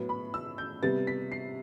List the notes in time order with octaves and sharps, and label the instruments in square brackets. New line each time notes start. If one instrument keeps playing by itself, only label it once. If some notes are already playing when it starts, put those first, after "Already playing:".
Already playing: [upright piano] A2 F#3 B3
B5
E6
G6
C3 G3 B3 A6
B6
C7